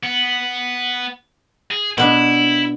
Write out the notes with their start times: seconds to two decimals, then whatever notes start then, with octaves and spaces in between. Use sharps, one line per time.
0.04 B3
1.71 G#4
1.98 B2 B3 D4 E4